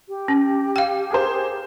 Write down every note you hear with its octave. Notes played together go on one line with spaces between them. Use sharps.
G4
C#4
F5 G5
G#4 A#4 C5